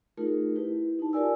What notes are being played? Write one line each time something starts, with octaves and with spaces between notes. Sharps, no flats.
A3 D#4 F4 G#4 A#4
E4 G4 B4
D#4 A5
F4 G4 A#4 D5 G#5 E6